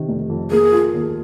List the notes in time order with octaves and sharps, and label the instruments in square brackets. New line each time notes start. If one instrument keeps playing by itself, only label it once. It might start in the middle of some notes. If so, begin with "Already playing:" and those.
Already playing: [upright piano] C3 D#3
F1
F2
[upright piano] A#3 [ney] G#4
[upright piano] F4
D#2